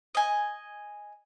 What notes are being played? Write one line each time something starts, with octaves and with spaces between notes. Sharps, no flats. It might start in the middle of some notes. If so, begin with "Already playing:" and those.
D#5 G#5